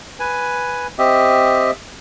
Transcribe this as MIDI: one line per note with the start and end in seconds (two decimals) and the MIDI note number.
0.20 0.87 71
0.20 0.87 80
0.99 1.71 60
0.99 1.71 67
0.99 1.71 75
0.99 1.71 76